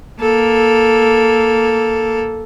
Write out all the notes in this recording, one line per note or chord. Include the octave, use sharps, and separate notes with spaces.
A#3 A4